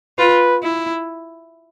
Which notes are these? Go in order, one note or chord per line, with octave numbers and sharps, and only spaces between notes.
F4 B4
E4